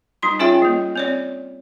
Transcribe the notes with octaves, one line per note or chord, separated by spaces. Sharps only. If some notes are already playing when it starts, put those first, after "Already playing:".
G3 D#4 C6
C#4 F4 G#4 C#5 E5 G5
G3 A#3
C4 C#5 D5